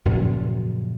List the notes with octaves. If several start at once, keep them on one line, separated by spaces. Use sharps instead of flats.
F#2 A#2 C#3 F3